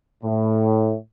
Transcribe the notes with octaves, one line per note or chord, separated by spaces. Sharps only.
A2